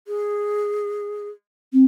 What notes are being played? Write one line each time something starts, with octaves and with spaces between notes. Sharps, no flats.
G#4
C4